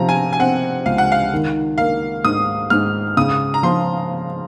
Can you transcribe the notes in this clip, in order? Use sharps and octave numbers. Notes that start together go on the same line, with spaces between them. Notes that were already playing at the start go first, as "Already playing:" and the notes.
Already playing: C3 F3 A#5
G#5
G#5
C4 F#5
C#2 F5
F#5
F5
D#3
A#3 F5
G#2 D#6
G#2 F6
C#3 D#6
A#5
F3 C6